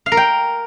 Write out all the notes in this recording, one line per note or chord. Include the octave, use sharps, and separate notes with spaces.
F5
A#4
G5